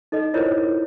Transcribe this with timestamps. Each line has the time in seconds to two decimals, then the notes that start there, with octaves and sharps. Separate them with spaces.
0.12 D#4 A4 D#5
0.34 E4 F4 A#4 C5 C#5